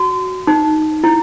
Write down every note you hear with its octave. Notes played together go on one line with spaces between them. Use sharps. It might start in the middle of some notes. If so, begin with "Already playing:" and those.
Already playing: F#4
D#4
E4